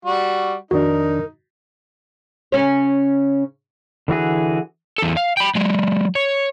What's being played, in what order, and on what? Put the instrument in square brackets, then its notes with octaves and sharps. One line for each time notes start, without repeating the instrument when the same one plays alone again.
[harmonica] G3 F#4
[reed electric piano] F2 D#3 D4 [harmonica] D#4 [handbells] F#4 [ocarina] A#4
[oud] C#3 C#4 C#5
[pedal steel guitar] D3 E3 F#4 G#4
[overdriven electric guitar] E2 A4
F5
G5 B5
F#3 G#3
C#5